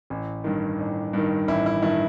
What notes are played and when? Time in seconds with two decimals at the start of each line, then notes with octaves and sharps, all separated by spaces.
0.10 A1
0.44 G2 D#3
0.79 A1
1.13 G2 D#3
1.48 A1 E4
1.66 E4
1.82 G2 D#3 E4